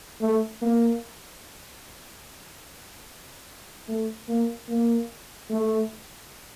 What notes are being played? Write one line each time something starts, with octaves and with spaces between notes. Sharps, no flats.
A3
A#3
A3
A#3
A#3
A3